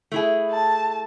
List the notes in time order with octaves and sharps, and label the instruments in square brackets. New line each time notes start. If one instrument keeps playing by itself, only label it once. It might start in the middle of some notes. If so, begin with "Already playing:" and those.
[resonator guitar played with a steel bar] A3 E4 G#4
[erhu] A5